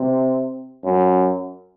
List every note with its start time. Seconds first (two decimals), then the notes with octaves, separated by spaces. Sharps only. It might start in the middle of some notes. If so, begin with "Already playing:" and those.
Already playing: C3
0.85 F#2